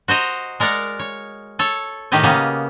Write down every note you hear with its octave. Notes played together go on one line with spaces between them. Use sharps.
F#4 C5 D#5 A#5
G#3 A#4 D5 F#5
C#5
A4 C#5
A2 D#3 G4 D#5 G#5
C#3 A#3 B3